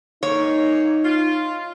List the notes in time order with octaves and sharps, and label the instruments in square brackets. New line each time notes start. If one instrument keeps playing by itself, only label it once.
[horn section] G#2 A#3 [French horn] D#4 [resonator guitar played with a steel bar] C#5
[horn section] F4